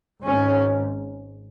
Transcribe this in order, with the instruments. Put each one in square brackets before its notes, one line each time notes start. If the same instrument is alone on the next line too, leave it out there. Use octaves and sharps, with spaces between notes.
[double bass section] G#1 G#2 C#4